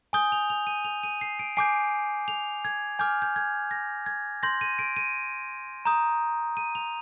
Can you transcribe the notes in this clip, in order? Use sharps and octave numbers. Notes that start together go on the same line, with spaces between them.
G#5 D#6 G6 G7
F7
F7
D#7
F7
D#7
C7
D7
G#5 D6 G6 C7
F7
G#6
G#5 D6 F6 G6
G6
G#6
A#6
G#6
C6 G6 A#6
D#7
D7
D#7
A#5 D#6 G6
D#7
F7